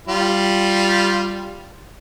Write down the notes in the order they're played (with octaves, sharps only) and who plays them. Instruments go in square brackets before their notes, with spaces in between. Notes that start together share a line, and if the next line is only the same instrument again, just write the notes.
[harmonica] G3 F4